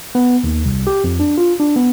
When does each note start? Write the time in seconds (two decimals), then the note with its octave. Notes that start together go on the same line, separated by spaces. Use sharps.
0.15 B3
0.44 D#2
0.65 C2
0.87 G4
1.04 F2
1.20 D4
1.38 F4
1.60 D4
1.76 B3